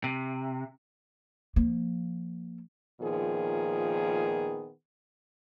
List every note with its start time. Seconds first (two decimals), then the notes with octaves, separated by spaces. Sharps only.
0.04 C3
1.56 F3 A#3
3.01 A#2 D#3 F3 B3 G#4